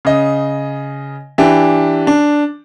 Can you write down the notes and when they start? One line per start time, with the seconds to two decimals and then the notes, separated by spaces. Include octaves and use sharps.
0.05 C#3 D#5
1.38 E3 D4 G4
2.07 D4